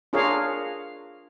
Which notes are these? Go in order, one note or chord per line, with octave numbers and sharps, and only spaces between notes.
D4 F4 G#4 A#4 C#5 F5